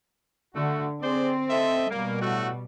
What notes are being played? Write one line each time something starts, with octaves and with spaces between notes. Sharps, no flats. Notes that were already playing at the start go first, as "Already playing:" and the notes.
D3 A3 F#4
C4 G#4 C5 D5
A4 D#5 E5
B2 G3 A#3
A2 A3 F#4